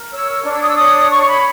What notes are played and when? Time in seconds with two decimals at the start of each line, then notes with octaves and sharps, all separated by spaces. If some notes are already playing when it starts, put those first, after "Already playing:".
Already playing: A#4
0.11 C#5 E6
0.44 D4
0.53 E6
0.61 D#6
0.69 E6
0.78 C#5 D#6
1.11 C#5 C#6
1.29 B5